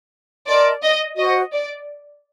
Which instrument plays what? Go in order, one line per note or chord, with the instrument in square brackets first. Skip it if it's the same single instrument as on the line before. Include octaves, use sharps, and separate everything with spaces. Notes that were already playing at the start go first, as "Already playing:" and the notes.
[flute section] A#4 D#5 A5 C6 [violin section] D5
[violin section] D#5
[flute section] F#4 C5 F#5 [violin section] D#5
[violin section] D5